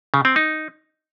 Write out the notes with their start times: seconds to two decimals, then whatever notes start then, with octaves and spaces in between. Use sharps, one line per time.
0.14 C#3
0.25 C4
0.36 D#4